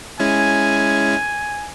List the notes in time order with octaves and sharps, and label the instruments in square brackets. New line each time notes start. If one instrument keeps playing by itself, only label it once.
[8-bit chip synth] G#3 C#4 E4 [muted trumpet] G#5